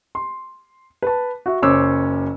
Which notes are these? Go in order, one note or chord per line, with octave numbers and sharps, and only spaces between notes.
C6
B4 A5
F#4 E5
F#1 C#4 C5 C#5 D6 E6